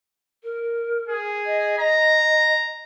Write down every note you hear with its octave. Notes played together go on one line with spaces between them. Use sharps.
A#4
G#4
D#5
D#5 A#5